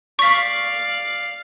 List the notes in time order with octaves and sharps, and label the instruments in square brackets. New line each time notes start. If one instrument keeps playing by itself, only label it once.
[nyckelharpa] D5 F5 [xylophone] C#6 B6